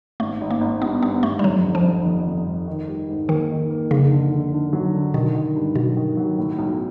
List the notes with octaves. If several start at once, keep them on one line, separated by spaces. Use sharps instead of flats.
G#1 A3
G#1
A#3
G#1
G2 B3
G2 B3
G#1 A3
G3
F2 F#3
F1
F3
F1
F2
F2
F1
D#3
G3
G#2
D#3 A#3
D#3
A#3
F1 C#3
D3
D3
D3
F#3
D3
B2 D#3
D#3
G2
B2 F#3
D#3
F#3
A2
B1